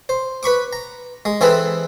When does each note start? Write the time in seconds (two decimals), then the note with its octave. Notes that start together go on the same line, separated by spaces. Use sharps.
0.09 C5
0.43 B4 B5 C#6 D6
0.73 A#5
1.25 G#3
1.41 E3 C4 E4 G#4 A4 B4